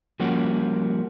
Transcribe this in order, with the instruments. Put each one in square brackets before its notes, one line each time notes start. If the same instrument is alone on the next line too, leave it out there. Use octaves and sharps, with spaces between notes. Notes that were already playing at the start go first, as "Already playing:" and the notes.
[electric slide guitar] F3 G3 A#3 C#4 F#4